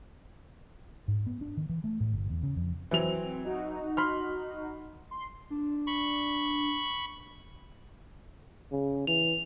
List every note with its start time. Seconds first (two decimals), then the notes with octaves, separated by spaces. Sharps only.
1.08 G#2
1.26 B3
1.41 D4
1.57 D#3
1.69 E3
1.84 A3
2.00 A2
2.12 G1
2.30 E2
2.43 C#3
2.56 F2
2.91 E3 F#3 C4 F7
3.44 D#4 F#4
3.97 B5 C6 F6
5.11 C6
5.50 D4
5.87 B5 C#6
8.72 C#3
9.07 E3 F7